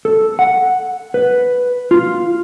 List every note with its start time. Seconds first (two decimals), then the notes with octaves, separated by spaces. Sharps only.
0.05 A4
0.39 F#5
1.14 B4
1.91 F4